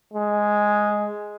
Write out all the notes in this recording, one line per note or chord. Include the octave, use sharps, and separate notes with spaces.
G#3